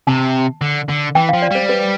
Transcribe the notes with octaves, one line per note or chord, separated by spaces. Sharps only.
C3 A5
D3
D3
E3 G5
F3 F5
D5
G3 C5
B4